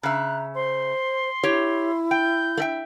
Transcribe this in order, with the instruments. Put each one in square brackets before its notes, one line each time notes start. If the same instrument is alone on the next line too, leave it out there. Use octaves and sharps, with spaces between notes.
[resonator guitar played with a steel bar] C#3 E5 [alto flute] A#5 [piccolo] F#6
[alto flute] C5 [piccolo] C6
[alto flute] E4 [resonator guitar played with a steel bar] G4 C#5
[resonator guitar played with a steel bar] G5 [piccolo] G6
[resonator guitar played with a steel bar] A3 E5 G5